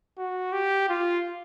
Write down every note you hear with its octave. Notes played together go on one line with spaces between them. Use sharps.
F#4
G4
F4